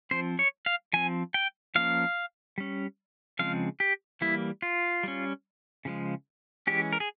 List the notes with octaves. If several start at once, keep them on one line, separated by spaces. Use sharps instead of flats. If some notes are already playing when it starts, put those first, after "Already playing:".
F3 C4 C5
C#5
F5
F3 C4 G#5
G5
F3 A#3 C#4 F5
G3 C#4
C#3 F3 G#3 C4 F5
G4
E3 G3 A#3 E4
F4
G3 C#4
C#3 F3 G#3
E3 G#3 C#4 G4
A#4
G#4